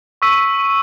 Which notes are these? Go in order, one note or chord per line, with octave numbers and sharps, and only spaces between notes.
C#6 E6 B6 D#7